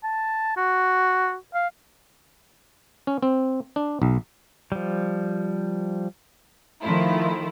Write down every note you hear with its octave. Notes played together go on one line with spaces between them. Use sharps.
A5
F#4
F5
C#4
C4
D4
B1
F3 G3
D#3 F3 A3 E4 F4